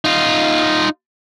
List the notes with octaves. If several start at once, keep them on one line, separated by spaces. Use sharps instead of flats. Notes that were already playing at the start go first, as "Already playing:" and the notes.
D#4 F4